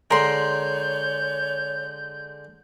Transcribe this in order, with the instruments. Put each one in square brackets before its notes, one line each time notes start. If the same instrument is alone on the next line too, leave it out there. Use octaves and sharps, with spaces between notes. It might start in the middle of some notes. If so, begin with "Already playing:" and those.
[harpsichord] D3 G#3 [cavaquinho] A#4 C6 [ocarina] C#5 [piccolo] G6